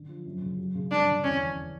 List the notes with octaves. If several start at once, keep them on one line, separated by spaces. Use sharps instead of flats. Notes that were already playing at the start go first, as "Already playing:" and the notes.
Already playing: D3
F3
F#2
C#3
F#3
C#3
G2 D4
D3
E2 C#4
F1